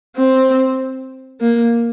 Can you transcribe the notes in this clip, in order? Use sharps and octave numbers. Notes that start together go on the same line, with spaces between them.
C4
A#3